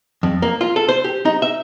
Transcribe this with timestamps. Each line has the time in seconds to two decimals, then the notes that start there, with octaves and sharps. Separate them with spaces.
0.23 F2
0.42 A#3
0.61 F4
0.76 A4
0.89 C5
1.04 G4
1.25 D#4
1.42 E5